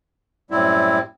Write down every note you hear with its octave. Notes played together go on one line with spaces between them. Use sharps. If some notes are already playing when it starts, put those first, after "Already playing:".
F#2 A2 G3 C4 E4